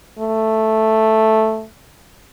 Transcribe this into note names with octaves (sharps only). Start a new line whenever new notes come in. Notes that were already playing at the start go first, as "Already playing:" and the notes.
A3